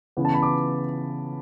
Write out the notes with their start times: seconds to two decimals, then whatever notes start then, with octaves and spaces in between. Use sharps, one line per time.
0.17 C#3 E3 B3
0.25 A5
0.34 B5
0.42 D6